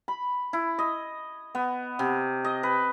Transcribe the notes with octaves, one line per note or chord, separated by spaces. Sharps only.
B5
E4
D#5
B3
C3
D#5
B4